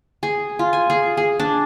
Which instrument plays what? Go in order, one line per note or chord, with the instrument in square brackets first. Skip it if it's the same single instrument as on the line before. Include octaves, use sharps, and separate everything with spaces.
[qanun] G#4
F4
G#5
G#4
G#4
D4